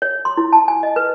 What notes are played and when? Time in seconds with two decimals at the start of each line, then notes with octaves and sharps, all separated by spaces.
0.02 C#5
0.25 C6
0.37 E4
0.53 A5
0.68 G#5
0.83 D#5
0.96 B4